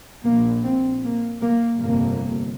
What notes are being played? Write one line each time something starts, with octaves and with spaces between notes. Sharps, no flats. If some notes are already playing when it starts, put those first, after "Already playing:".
A#1 A#2 A#3
C4
A#3
A#3
G1 F2 C3 A#3